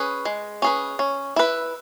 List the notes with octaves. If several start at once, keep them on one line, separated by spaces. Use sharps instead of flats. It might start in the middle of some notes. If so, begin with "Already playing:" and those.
Already playing: C#4 G#4 B4
G#3
C#4 G#4 B4
C#4
E4 B4